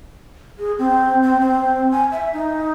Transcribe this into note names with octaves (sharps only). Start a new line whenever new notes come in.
G#4
C4
C4
C4
G#5
E5
D#4